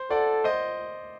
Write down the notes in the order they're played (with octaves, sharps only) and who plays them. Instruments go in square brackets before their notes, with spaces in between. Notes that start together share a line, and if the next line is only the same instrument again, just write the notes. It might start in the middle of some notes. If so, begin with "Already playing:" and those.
Already playing: [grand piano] C5
[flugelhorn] A4 [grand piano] D5 F#5
[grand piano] C5 D#5